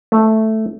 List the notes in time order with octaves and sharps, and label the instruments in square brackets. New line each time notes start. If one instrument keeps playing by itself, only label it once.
[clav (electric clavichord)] A3